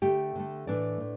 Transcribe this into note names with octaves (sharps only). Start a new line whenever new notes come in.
D3 A3 G4 G5
D3 A3
A2 E3 A3 D4 D5
A2